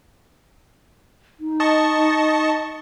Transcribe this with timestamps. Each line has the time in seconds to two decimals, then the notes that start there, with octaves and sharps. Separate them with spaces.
1.39 D#4
1.60 D#5 A5 C#6